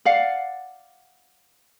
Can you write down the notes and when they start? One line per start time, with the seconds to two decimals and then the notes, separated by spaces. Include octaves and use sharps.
0.05 D5 F5 F#5